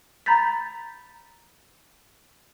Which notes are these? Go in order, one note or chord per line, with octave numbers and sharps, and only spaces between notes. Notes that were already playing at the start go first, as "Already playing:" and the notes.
A#5 B5 G6 A6 B6